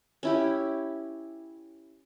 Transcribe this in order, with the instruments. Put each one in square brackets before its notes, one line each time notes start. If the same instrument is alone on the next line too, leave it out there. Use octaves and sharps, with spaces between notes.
[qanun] C#4 E4 G4